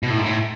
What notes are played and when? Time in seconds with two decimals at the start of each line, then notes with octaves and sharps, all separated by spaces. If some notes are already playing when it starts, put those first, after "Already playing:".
0.03 B2
0.10 A2
0.19 G#2
0.26 A2